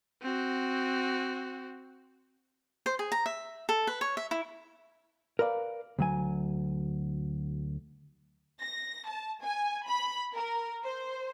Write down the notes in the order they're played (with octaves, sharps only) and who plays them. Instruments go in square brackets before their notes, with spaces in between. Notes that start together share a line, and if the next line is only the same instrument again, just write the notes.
[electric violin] C4 F#4
[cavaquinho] C5
G#4
A#5
E5
A4
B4
C#5
E5
E4
[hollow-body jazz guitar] A#4 B4 D5 E5 F5
D2 F#3 G#5
[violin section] A#6
A5
G#5
B5
A#4
C5